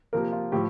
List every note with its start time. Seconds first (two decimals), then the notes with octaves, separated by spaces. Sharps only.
0.13 C3 F3 A#3 A#4
0.32 F4
0.52 A2 F3 G4